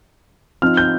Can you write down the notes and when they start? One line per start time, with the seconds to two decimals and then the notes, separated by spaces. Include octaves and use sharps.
0.62 F3 C4 D#4 F6
0.77 G6